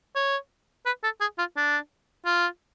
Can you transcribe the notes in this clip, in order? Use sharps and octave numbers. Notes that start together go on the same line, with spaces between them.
C#5
B4
A4
G#4
F4
D4
F4